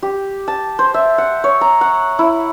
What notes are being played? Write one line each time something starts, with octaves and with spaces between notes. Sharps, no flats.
G4
A5
C5
E5
F#5
C#5
A#5
F#5
E4